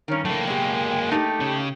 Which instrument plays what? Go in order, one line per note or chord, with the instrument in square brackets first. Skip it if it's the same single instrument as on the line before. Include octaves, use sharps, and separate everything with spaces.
[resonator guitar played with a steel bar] G2 D#3 [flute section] C#4 A#4
[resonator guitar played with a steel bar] E3 [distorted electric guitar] F#3 A#3 [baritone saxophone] A3 [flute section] G5
[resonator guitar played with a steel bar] B2 G4 [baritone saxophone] G#3
[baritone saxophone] A3 [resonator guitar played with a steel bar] D#4 [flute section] G4
[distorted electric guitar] C#3